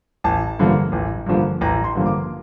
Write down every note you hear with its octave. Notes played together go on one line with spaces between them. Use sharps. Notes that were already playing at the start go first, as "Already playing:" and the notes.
A1 A5
G2 D3 F3 A#3
A1
G2 D3 F3 A#3
A1 A#5
C6
G2 D3 F3 A#3
D6